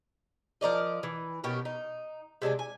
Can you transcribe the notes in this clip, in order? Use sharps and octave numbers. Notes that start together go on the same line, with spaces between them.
F3 A#4 D5 D#5
E3
B2 C#4 G4 A#4
D#4
C3 G#3 D4 G#5
G#5